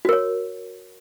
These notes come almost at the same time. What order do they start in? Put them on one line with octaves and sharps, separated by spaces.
F#4 A#4 C#5